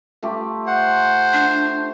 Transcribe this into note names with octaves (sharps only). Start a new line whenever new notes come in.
A3 F4 G4
C5 F#5
D4